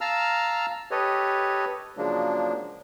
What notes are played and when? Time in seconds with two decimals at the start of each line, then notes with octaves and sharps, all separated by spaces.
0.01 F5 A5 A#5 E6 F6
0.91 G4 A4 B4 C#5 D#5
1.97 C#3 F3 F#3 G#3 A#3 D4